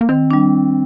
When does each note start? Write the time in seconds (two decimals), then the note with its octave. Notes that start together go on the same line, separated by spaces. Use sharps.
0.01 A#3
0.09 D#3 C4
0.31 G3 D4